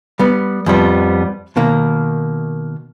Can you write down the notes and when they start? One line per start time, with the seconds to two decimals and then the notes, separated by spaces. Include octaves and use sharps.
0.19 G3 B3
0.66 F2 F3 G3 B3
1.56 B2 D#3 A#3